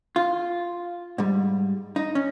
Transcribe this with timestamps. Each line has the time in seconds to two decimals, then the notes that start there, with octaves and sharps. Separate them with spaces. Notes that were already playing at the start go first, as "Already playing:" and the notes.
0.16 F4
1.18 G#2 G3
1.96 D#4
2.15 C#4